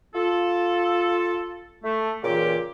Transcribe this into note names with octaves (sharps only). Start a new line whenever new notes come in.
F4 A4
A3
A#2 C#3 E3 F4 G4 D6